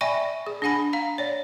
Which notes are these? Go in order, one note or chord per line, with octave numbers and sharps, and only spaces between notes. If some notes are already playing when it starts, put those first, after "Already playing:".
D5 E5 G5 G#5 B5 C#6
D5
G#4
D4 G#4 F#5 G#5 B5
F5 A#5
C#5 D5